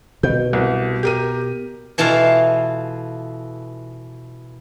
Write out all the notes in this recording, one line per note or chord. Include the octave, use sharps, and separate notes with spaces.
B2 G6
C2
G4 A#4 D#7
B2 E3 F4 A4 F5